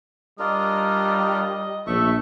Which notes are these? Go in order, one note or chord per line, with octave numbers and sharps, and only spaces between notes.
G3 D4 F4 A#4 D#5
A#1 A3 E5 C#6